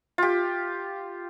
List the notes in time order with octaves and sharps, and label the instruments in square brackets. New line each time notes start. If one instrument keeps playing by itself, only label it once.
[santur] F4 G4